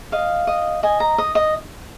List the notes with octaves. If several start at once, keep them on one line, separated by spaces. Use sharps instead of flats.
D#5 F5
D#5
D#5 G#5
A#5
D#5
D#5